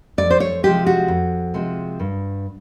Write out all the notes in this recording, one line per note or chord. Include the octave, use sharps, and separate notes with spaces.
F2 D5
C5
C#5
C3 F3 G#3 G4
F#4
F2
C3 F3 G#3
G2